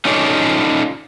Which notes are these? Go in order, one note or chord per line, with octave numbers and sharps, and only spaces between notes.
C#4 D#4 F4 A4 C#5 D5